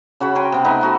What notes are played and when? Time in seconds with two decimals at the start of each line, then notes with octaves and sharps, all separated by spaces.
0.20 C#3 F#4 C#5 B5
0.35 A#4 G5 G#5 C6
0.52 C3 B3
0.64 A3 D#4 B4
0.81 D#4 F#4 A4